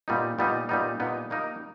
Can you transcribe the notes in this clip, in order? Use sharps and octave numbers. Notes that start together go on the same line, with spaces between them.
A#2 G3 B3 D#4
A#2 G3 B3 D#4
A#2 G3 B3 D#4
A#2 G3 B3 D#4
G3 A#3 D#4 A#4